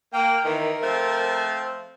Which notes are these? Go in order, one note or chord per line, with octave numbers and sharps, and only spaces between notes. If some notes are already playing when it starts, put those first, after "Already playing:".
A#3 G5
D#3 E3 A#4
F3 A3 C4